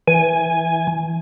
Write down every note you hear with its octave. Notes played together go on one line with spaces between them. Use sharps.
E3 G#5